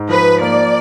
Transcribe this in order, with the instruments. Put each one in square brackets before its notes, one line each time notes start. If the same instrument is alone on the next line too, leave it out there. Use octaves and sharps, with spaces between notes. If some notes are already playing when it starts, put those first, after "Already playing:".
Already playing: [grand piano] G#2
[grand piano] F3 [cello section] B4
[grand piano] A#3 [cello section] D5